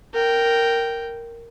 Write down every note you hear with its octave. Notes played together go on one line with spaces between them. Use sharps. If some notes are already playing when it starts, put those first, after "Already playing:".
A#4 G5